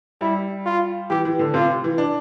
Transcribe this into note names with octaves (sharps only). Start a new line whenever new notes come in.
G3 E4
F4
E3 G4
E3
D3
C3 F4
E3
D4